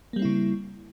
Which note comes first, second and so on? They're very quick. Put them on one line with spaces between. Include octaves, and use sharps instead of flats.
A#3 G3 C4 E4 C#3